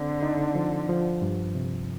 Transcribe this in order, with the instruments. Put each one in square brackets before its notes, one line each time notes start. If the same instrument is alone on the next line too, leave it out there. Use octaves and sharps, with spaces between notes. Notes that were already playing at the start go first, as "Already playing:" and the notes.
Already playing: [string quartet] D3 [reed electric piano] C4
[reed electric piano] D#4
F3
F3
G2
C3